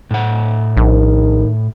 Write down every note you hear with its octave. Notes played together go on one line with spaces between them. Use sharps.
A2 F#5
A#1 D#3